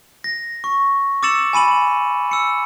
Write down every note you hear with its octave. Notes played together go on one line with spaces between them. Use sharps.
A#6
C#6
D6 E6 A6 C#7 E7 F#7
G#5 B5 D#7 F#7
E6 C#7